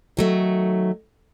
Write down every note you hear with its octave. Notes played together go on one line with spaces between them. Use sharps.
D#3 F#3 A3